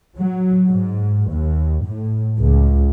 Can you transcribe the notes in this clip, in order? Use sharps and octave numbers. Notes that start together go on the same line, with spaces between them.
F#3
G#2
D#2
A2
C#2